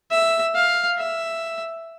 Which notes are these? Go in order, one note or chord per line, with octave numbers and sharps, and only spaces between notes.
E5
F5
E5